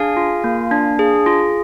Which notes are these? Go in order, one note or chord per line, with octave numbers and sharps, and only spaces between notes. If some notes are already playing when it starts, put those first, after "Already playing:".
Already playing: D4 G#4 F5 G#5
F4
A#3
D4
G#4
F4